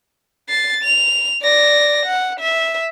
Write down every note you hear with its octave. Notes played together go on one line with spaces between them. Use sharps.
A6 C7
F7
D5 A#6
F#5
E5